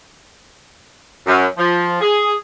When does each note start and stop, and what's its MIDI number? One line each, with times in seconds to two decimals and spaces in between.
1.27 1.46 42
1.57 1.99 53
2.01 2.32 68